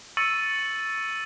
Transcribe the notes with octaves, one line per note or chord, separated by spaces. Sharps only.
C#6 E6 A6 C#7 D#7 F#7